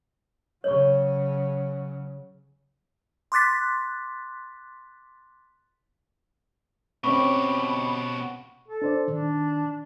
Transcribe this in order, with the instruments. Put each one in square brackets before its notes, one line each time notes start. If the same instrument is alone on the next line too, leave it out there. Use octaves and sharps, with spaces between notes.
[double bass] C#3 F#3 [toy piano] C#5 C#6
[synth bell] C6 D6 F#6 A6 B6
[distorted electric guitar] B2 G4 [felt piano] C4 C#4 [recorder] B5 [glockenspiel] C#6
[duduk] A4
[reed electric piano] D4 C5 D5
[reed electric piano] D#3 [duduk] D4